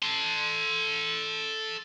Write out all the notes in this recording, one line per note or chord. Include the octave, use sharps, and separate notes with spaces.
A4 C6